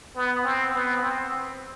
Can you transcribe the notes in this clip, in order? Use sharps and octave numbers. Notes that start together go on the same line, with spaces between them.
B3
C4
B3
C4